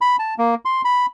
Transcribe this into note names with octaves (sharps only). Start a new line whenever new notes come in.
B5
A5
A#3
C6
B5